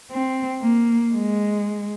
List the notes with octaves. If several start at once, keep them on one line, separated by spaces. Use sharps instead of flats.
C4
A#3
G#3